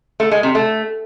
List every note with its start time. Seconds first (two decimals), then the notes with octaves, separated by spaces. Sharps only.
0.20 A3
0.31 G#3
0.43 C3
0.55 A3